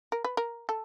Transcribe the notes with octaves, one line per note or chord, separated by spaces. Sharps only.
A#4
B4
A#4
A4